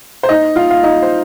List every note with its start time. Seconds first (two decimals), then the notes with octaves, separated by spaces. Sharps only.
0.23 C5
0.29 D#4 D#5
0.56 F4 F5
0.71 F5
0.83 D#4 D#5
1.03 C5